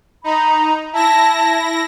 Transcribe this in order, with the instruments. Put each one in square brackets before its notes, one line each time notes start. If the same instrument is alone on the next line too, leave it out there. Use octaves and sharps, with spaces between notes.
[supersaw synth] D#4 [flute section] A#5 B5
[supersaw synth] E4 A#6 [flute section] A5